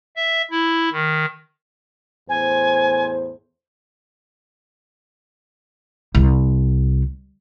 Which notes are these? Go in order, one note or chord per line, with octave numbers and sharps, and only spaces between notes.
E5
E4
D#3
E2 A2 C5 G#5
C2